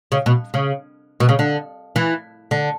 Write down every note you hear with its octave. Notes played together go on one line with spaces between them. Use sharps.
C#3
B2
C#3
B2
C#3
D3
E3
D3